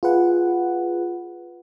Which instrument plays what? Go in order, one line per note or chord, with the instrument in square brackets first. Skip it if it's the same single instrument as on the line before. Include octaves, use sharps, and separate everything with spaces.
[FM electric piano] F4 G#4 B4 F#5